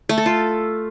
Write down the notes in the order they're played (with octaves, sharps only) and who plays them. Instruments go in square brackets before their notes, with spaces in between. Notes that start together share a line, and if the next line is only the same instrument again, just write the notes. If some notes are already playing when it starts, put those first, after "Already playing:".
[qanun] A3
A4
F4